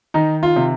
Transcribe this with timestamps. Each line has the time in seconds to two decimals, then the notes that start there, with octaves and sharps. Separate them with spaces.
0.14 D#3 D#4
0.43 F4
0.56 C3